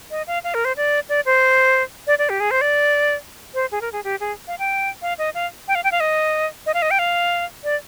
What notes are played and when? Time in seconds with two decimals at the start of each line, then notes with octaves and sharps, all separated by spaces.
0.11 D#5
0.27 F5
0.44 F5
0.54 A#4
0.65 C5
0.77 D5
1.09 D5
1.26 C5
2.07 D5
2.19 D5
2.29 G4
2.40 G#4
2.51 C5
2.61 D5
3.54 C5
3.72 G#4
3.81 A#4
3.93 G#4
4.04 G4
4.20 G#4
4.48 F5
4.59 G5
5.02 F5
5.18 D#5
5.35 F5
5.68 G5
5.75 F5
5.84 G5
5.92 F5
6.00 D#5
6.66 D#5
6.74 F5
6.82 D#5
6.91 G5
6.99 F5
7.64 D5